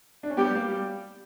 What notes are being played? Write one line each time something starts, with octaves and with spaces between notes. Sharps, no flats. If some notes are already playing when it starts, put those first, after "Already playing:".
D4
C#4
G3 B3 G4
A#3
G3